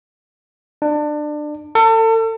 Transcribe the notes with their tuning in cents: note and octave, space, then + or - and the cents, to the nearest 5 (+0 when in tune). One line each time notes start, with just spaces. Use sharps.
D4 +25
A4 +35